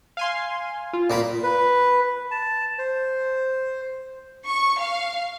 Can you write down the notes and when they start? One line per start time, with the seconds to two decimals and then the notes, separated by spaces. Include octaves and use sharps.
0.17 F5 G#5 C6
0.93 F4
1.10 A#2 A#3 B5
1.43 B4
2.31 A5
2.79 C5
4.46 C#6
4.78 F5